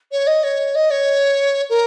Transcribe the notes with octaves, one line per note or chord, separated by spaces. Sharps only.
C#5
D#5
C#5
D#5
C#5
A#4